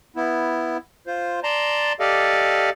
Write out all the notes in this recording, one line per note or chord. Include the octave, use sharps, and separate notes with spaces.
B3 E4
F4 C5
D5 A5 A#5 C6
G4 A4 D5 D#5 F5